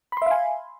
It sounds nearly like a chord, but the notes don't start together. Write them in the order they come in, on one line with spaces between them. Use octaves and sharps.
B5 C6 E5 F5 G#5